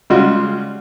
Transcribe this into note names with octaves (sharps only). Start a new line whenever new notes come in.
C#3 G3 G#3 F4 F#4